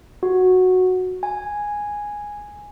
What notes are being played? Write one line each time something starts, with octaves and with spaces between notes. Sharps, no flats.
F#4
G#5